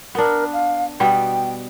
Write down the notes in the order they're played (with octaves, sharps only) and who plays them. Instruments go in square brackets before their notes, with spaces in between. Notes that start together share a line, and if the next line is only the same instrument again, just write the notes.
[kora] B3 D4 [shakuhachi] A#4
[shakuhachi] F5
[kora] B2 G3 B3 [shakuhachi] G5